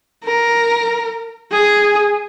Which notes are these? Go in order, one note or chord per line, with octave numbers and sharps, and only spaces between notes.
A#4
G#4